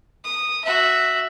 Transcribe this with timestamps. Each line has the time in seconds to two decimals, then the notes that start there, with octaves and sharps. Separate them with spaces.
0.24 D#6
0.64 F#4 E5